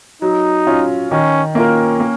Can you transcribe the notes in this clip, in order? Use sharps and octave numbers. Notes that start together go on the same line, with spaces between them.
F#3 D#4
C#4 F4
D#3 C#4
A#3 C#4 F4 A#4
A#3